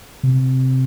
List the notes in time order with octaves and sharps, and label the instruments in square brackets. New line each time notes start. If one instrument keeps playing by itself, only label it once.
[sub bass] C3